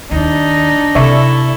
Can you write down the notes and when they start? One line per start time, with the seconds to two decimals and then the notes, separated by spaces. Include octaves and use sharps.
0.11 D#2 D4 D#4
0.95 C3 E4 A4 D5 E5 C#6